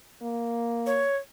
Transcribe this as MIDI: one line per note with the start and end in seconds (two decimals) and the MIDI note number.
0.22 1.06 58
0.86 1.17 73